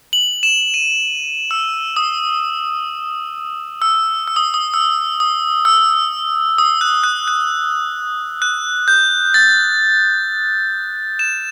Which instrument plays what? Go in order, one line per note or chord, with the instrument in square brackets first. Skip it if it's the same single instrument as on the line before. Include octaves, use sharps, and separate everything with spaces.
[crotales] F#7
E7
D#7
E6
D#6
E6
E6
D#6
D#6
E6
D#6
E6
D#6
F#6
F#6
F#6
F#6
G6
A6
E7